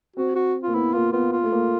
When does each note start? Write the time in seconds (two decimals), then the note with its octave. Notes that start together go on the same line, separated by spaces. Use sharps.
0.16 C4 F#4
0.35 F#4
0.63 A#3 F4
0.75 B3 E4
0.94 A#3 F4
1.13 B3 F4
1.32 F4
1.43 A3
1.52 A#3